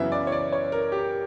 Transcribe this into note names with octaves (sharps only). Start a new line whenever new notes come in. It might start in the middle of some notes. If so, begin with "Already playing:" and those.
Already playing: F#2 C#3 E3 B3 E5
D5
C#5
D5
C#5
A#4
G4